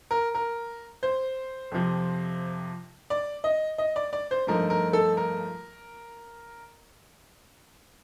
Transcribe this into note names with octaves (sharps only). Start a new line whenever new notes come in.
A#4
A#4
C5
F2 C3 F3
D5
D#5
D#5
D5
D5
C5
G2 F3 A3 D#4 A#4
A#4
A4
A#4